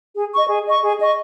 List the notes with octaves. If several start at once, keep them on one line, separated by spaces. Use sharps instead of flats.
G#4
D#5 C#6
G#4
D#5 C#6
G#4
D#5 C#6